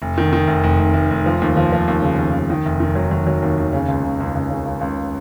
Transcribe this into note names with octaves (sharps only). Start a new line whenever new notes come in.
F1
D#3
D#3
F1
F1
F1
F1
F1
F3
D#2
F3
F3
D#2
C#3
D#2
D#2
D#3
F1
D#3
F#3
F#3
F#3
D#2
D#2
C#3
C#2
C#2
C#2
C#2
C#3
C#2
C#2